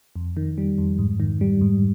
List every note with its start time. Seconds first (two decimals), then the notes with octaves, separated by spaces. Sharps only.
0.16 F2
0.37 D#3
0.58 G3
0.78 F2
0.99 G#2
1.20 D#3
1.41 G3
1.61 G#2